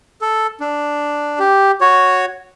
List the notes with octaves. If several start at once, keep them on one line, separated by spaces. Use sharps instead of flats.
A4
D4
G4
F#4 C#5